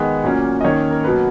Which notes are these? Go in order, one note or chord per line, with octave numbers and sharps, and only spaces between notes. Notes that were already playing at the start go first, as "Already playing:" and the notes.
Already playing: D#3 G#3 B3
A#2 F#3 A#3 C#4
D#5
D#3 A#3 C#4 C#5
A#4
B2 F#3 A#3 B4